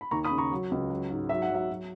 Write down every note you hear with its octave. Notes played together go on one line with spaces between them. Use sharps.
B5
D#2 A#5 C#6
B5 D#6
C#3
A#5 C#6
F#3
C#2
F#3
G#2
F#3 E5
F#5
F#3 E5
F#3